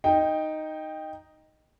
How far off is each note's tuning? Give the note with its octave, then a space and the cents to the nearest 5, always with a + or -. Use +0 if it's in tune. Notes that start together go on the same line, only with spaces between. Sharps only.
D#4 +0 G5 +5